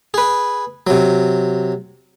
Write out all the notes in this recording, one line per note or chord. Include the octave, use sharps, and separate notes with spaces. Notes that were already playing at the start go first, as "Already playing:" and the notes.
G#4 B4
C3 F#3